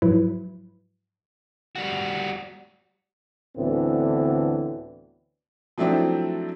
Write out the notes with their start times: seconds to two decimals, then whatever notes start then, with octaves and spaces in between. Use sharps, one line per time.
0.02 G#2 F3 F#3 E4 B4
1.76 G3 F#4
3.57 D2 A2 D3 E3 B3 C4
5.78 F3 F#3 A3 C4 D4 E4